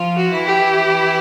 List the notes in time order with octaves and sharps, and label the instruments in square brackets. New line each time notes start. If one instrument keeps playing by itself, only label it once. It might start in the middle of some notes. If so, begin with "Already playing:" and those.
Already playing: [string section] F3 F4
[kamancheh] F#4
[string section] E3 E4
[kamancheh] G4